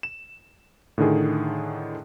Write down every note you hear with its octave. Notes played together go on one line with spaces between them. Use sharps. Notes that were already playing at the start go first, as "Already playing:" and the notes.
E7
A2 D3 D#3 G#4